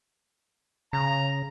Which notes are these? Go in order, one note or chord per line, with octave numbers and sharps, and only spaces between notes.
C#3 A#5